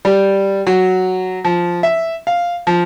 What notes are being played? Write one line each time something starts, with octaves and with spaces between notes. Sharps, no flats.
G3
F#3
F3
E5
F5
F3